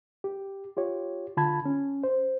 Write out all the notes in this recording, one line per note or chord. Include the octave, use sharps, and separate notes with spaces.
G4
F4 G4 C#5
D3 F4 A5 B5 G#6
C#4
C5